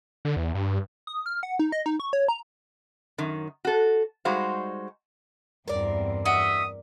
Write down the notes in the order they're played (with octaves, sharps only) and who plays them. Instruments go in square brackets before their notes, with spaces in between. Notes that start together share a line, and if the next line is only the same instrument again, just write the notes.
[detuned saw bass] D3
E2
G2
[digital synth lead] D#6
F6
F#5
D#4
D#5
D#4
C#6
C#5
A#5
[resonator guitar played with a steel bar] F#2 D#3
F#4 A4
G3 G#3 D#4 F#4 C5 F5
[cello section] E2 G2 C4 [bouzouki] A#4 D5
[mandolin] F#4 D#5 E5 [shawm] D#6